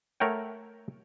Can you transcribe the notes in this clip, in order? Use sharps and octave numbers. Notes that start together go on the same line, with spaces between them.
A3 A#4 C#5 F#5 G5